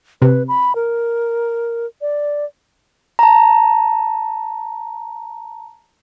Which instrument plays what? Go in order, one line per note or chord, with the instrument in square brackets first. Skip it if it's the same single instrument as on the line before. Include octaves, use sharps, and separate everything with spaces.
[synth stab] C3 [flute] B4
[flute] B5
A#4
D5
[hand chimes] A5 A#5